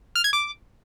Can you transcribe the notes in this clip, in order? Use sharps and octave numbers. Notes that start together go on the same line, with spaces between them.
F6
G#6
D6